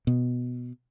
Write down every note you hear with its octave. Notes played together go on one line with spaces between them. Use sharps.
B2